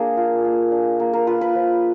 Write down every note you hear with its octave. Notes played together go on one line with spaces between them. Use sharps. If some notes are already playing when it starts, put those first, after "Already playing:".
Already playing: A#3 D4 G#4
F4
A#3
D4
A#3
A#4
F4 B4
B4
F3